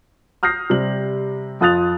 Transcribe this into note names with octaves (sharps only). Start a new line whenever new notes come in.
D#6 F6 G6 A#6 C7
C3 G3 F#7
F2 F4 D#6 F#6 A6 F7